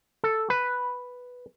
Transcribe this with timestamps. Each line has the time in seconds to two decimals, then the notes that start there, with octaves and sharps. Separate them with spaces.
0.24 A4
0.50 B4